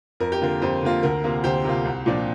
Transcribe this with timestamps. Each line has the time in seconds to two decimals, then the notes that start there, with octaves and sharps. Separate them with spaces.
0.20 F2 A#4
0.32 G4
0.42 D3 A#3 F4 A#4
0.62 F2 G4 C5
0.83 D3 A#3 F4
1.03 D2 A#4
1.24 C3 A#3 F4
1.44 D2 G4 C5
1.65 C3 A#3 F4
1.85 C2
2.06 A#2 F3 D4